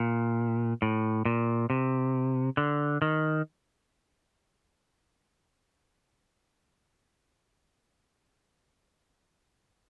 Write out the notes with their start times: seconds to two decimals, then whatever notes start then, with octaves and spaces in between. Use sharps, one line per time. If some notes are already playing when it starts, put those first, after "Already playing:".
Already playing: A#2
0.82 A2
1.25 A#2
1.70 C3
2.57 D3
3.02 D#3